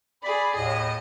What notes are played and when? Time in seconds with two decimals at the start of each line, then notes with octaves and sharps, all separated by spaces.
0.23 G#4 D5 B5
0.56 D#2 A2 D#5